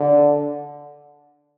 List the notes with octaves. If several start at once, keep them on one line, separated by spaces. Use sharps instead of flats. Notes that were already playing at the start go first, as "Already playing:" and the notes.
Already playing: D3